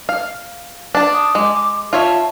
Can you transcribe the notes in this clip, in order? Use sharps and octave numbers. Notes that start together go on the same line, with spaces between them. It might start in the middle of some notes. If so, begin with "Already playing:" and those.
F5
D4 A5
D#6
G#3 D6
F4 C#5 E5 A5